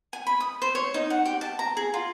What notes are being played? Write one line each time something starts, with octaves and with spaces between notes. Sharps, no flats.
G#5
B5
D#6
C5
C#5
D#4
F#5
G4
A5
A#5
G#4
F4